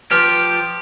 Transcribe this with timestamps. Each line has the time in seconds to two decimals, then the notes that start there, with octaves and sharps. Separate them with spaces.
0.11 F3 G4 B4